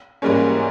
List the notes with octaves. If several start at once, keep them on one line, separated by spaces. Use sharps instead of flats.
G#2 E3 G3 A#3 C#4